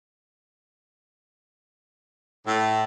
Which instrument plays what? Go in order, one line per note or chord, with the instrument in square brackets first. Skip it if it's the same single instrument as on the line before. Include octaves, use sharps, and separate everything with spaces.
[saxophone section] A2